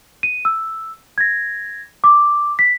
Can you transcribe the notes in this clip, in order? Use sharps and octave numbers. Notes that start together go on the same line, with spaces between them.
D#7
E6
G#6 A#6
D6
B6